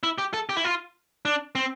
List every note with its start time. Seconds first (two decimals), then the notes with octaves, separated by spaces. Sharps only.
0.03 E4
0.18 G4
0.34 A4
0.49 G4
0.57 E4
0.64 F4
1.25 D4
1.55 C4